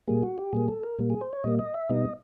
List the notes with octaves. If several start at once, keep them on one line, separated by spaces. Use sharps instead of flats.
A#2 G3 A#3 G#4
F#4
G4
A#2 G3 A#3 G#4
A4
A#4
A#2 G3 A#3
G#4
C5
C#5
A#2 G3 A#3 D#5
D#5
E5
B2 G3 B3 D#4 D#5